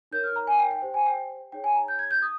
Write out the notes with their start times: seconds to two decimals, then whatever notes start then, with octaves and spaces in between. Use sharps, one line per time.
0.12 D#4 A#4 C#5 G6
0.24 F6
0.36 A#5
0.47 G#5
0.59 G5
0.71 G5
0.82 G4 C5 G5
0.94 G#5
1.06 G5
1.52 D#4 G#4 C#5 G5
1.64 G#5
1.75 A#5
1.88 G6
1.99 G#6
2.11 G6
2.22 D#6